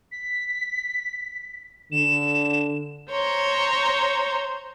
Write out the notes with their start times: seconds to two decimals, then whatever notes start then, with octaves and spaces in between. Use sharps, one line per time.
0.11 B6
1.92 D3 E7
3.09 C5 C#5 A#5